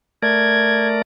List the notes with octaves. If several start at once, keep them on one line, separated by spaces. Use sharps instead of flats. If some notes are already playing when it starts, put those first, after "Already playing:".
A3 A#4 D5 G#6